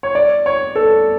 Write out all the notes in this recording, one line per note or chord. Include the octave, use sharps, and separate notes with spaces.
C#5
D5
C#5
A4